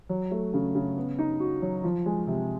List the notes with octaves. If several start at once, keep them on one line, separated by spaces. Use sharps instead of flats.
F#3
A3
C#3
C#3
B3
D#4
F#4
F#3
F3
G#3
C3